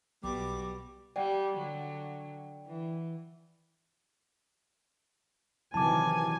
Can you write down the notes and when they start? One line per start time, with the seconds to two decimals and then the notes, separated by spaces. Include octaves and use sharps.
0.24 B1 B2 F#3 G3 D6
1.16 G3 D5 F#5 G5
1.54 D3 F#3
2.66 E3
5.74 C3 D#3 E3 F#3 E4 G#5 A5 D6